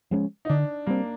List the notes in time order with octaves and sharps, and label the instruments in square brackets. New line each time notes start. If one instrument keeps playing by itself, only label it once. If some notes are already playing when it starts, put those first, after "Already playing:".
[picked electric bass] F3 G#3 C#4
[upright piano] D#4
[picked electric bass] D3 [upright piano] D4
[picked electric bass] G3 C4 [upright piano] A#3